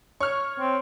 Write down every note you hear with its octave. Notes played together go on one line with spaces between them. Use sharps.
C#5 C#6 F6
C4